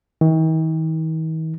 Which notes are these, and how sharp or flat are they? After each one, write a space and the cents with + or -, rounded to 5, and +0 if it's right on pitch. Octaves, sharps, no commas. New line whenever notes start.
D#3 +45